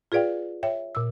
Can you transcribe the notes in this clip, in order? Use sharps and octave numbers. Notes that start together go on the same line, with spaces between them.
F4 G#4 B4 D5 F5 G5
C#5 E5 G5
A#2 E6